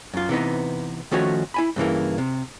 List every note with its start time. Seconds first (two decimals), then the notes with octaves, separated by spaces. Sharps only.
0.14 F#2 F4
0.29 C3 E3 B3 D#4
1.11 D#3 F3 A3 C#4 F#4 C#5
1.54 E4 G#5 B5
1.76 G2 C#3 E3 A#3
2.18 C3